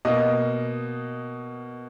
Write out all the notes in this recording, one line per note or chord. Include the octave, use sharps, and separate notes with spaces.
B2 A#3 D#5